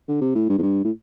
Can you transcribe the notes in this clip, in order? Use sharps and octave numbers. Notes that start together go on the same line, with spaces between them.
D3
C3
A2
G2
E2
G2
A2